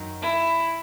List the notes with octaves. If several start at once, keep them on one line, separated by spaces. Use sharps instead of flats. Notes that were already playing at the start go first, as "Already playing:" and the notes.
Already playing: F#2 D#3 F#3
E4